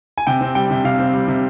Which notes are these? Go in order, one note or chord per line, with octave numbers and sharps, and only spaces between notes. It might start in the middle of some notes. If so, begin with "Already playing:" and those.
G#5
C3 G5
C4
G3 G5
C3
C3 F5
C4
G3
C3